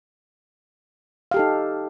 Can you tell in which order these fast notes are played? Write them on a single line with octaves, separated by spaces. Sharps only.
F5 G4 A4 D#4